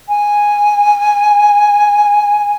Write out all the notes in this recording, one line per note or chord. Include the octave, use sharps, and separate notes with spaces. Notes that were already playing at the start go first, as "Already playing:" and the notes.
G#5